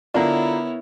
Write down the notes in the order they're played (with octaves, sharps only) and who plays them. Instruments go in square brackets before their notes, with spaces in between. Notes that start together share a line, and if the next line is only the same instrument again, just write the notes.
[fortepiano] D3 D4 [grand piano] B3 A#4 [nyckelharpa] E4 C#5 [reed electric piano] F4 A#5